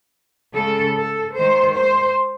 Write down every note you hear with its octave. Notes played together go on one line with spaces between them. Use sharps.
C#3 G#3 A4
A4
D#3 G#3 C5
C5